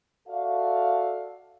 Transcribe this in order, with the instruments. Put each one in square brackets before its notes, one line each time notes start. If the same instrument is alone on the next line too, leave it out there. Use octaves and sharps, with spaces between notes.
[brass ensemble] F#4 A4 D5 E5 F5